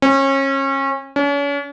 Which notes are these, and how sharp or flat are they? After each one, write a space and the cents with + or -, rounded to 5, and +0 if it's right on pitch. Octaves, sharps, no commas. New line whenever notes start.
C#4 -30
C#4 +40